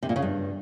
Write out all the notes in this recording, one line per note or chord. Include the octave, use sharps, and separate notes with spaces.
C3
A#2
C#3
G2